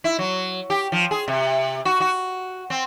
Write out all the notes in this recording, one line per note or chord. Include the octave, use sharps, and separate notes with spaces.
E4
F#3
G4
F3
G#4
C3
F#4
F#4
C4